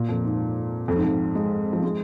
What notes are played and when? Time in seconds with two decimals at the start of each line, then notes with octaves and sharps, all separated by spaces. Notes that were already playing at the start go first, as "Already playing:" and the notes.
Already playing: A#2
0.09 F2
0.24 G#2
0.88 F2
0.96 G#2
1.04 F2
1.35 G#3
1.73 F3
1.83 G#3